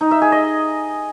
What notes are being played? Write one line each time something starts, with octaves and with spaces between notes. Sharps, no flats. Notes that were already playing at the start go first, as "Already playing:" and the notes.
D#4
E5
G#4
D#5